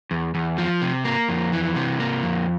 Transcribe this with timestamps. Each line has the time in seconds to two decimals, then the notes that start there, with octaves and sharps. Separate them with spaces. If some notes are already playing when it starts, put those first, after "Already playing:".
0.11 E2
0.35 E2
0.58 F3
0.82 C3
1.05 A#3
1.29 F2
1.52 E3
1.76 C3
2.00 A#3
2.23 F2